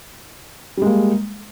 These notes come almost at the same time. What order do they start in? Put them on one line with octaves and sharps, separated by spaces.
G3 G#3 A#3